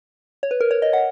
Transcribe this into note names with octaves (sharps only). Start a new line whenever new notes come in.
C#5
B4
A#4
C#5
D#5
F#5